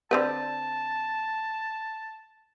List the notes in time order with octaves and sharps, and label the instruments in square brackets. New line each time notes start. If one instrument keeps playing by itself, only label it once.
[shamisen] D3 C4 B4 [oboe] A5